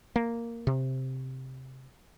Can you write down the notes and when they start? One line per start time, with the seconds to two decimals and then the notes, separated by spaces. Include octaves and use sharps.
0.16 A#3
0.67 C3